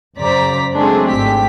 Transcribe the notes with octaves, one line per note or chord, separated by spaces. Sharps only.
F#2 C#3 C5 D5 A#5 B6
F#3 G#3 A3 C4 D4 G#4
G#1 G4 B6